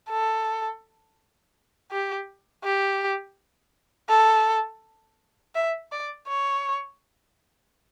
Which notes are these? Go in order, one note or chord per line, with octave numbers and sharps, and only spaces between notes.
A4
G4
G4
A4
E5
D5
C#5